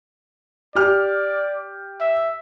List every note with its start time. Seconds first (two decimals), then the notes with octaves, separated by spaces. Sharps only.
0.75 G4 D5 F6
2.01 E5